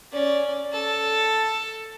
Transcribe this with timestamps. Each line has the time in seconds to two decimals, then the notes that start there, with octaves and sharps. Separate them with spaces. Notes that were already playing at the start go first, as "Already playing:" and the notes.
0.12 C#4 D5
0.73 A4